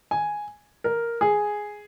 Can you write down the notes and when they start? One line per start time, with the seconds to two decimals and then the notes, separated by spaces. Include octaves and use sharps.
0.11 G#5
0.84 A#4
1.21 G#4